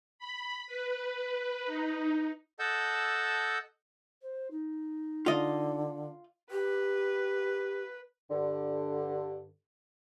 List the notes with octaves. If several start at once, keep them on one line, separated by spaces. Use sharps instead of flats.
B5
B4
D#4
A4 D#5 F#5 A5 E6 G6
C5
D#4
D3 F4 D#5
G4 B4
G2 D3